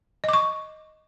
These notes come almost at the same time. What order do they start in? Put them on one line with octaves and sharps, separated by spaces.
D#5 D6 C#6